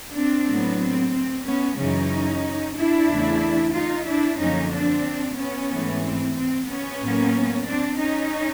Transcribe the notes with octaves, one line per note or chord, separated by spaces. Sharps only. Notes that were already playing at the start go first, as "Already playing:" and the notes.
C4 D4
A2 F#3 B3
C4
C4
B3 C#4
F#2 C#3 E3 C#4 D#4
D4 E4
E2 C#3 E3 A3
D#4 F4
D4 E4
F#2 D3 F3 A#3 C#4 D#4
C4 D4
B3 C#4
G#2 E3 A3
C4
C4
B3 C#4
A2 F#3 A#3
C4 D4
C#4 D#4